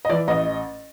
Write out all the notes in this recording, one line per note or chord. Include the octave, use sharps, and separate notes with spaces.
D#5
E3 D5
A1 D#5